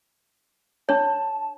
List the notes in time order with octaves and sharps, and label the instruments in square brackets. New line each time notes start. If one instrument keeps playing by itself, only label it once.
[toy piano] D4 C#5 [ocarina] A5